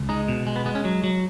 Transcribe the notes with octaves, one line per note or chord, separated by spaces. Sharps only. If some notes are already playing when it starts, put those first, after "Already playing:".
Already playing: C#2
G#3 D#4
B2
G#3
B3
G#3 B3
C#4
F#3
F#3